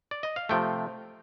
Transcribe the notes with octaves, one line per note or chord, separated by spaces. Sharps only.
D5
D#5
F5
C3 F3 A3 G5